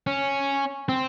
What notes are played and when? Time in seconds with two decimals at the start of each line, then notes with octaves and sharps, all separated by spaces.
0.07 C#4
0.89 C4